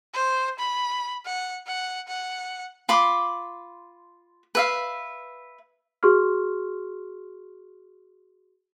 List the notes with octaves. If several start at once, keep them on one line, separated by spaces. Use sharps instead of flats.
C5
B5
F#5
F#5
F#5
F4 B5 C6 D6
B4 E5 F5
F#4 G#4 C6 C#6 F6